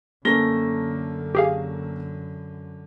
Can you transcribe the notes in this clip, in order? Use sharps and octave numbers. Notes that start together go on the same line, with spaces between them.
F#2 D3 A3 A#3 C#4 A#6 G7
G4 G#4 F5